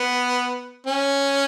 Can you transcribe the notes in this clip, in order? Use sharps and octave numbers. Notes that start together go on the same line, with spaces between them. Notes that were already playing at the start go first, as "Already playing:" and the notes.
Already playing: B3
C#4